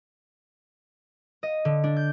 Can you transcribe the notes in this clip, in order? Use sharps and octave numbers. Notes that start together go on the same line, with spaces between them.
D#5
D3
D4
G6